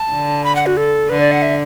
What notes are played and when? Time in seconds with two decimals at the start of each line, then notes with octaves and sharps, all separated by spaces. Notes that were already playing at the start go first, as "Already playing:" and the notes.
Already playing: A5
0.13 D3
0.44 B5
0.55 F#5
0.66 F#4
0.77 A4
1.09 D3 B4
1.20 D5
1.32 F#5
1.42 E5